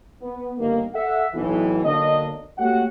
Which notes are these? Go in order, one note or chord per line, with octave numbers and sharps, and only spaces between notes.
B3
G1 D#3 A#3
A4 E5 F#5
B1 A2 E3
B1 D3 F#3 A#3 D4 D#5
A3 A#3 C#4 F#4 G4 F#5